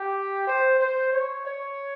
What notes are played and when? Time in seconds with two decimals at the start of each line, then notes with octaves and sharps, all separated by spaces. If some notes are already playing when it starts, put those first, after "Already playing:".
Already playing: G4
0.47 C5
0.80 C5
1.13 C#5
1.45 C#5